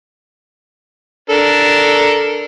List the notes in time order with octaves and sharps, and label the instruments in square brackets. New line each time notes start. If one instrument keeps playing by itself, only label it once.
[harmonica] D4 A4 A#4